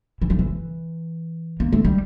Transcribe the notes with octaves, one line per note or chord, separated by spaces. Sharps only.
E3
F3
E3
A#3
A3
G3